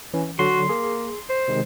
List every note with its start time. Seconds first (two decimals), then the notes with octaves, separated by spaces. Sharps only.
0.14 E3 C#4
0.39 D3 F#3 F#4 C6
0.69 A#3 G#4
1.29 C5
1.48 C3 D#3 G#3